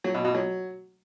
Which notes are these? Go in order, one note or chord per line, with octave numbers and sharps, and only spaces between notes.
F#3
B2
B2
F#3